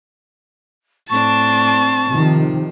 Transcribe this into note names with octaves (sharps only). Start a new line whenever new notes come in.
A2 C4 D4 A5 C#6
C3 D#3 F3